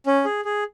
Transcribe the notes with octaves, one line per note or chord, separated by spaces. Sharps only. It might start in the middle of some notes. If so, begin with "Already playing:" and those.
C#4
G#4
G#4